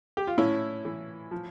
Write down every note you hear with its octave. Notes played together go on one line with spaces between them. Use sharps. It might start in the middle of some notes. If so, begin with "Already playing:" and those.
G4
F4
A2 C#4 E4
E3
F3